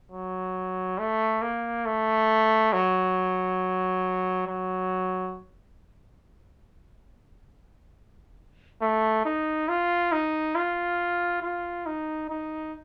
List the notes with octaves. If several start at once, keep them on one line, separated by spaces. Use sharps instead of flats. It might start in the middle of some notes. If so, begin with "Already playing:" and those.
F#3
A3
A#3
A3
F#3
F#3
A3
D#4
F4
D#4
F4
F4
D#4
D#4